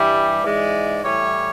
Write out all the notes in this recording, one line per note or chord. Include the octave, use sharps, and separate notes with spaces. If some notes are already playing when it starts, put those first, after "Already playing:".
Already playing: G2 E3 G3
G#2 E3 G#3 D5
A2 E3 G3 C#5